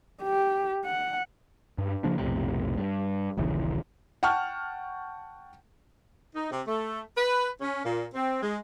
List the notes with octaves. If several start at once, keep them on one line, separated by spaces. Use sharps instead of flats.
G4
F#5
G2
C#3 F3 A#3 D4
B1 F2 A2 C3
G2
D#1 A#1 C#3 E3
F#5 G5 A5 C#6 F6
D#4
C3
A3
B4
C#4
A#2
C4
G#3